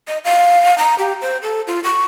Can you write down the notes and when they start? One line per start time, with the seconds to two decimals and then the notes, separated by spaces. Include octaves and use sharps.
0.08 D#5
0.25 F5
0.78 A#5
0.99 G4
1.22 C5
1.43 A4
1.67 F4
1.84 C#6